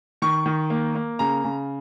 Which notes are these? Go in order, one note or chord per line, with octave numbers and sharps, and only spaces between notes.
D#3 C#6
D#3
A#3
A#3
C#3 A#5
C#3